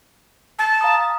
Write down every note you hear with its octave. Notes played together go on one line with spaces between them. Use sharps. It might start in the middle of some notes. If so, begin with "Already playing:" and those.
A5
F5 A#5 D#6